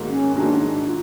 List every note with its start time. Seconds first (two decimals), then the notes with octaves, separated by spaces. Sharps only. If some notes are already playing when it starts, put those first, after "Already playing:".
Already playing: G#2 D#3 F#3 A#3
0.09 C#4
0.35 G#2 D#3 F#3 A#3 D4
0.61 D4
0.87 F4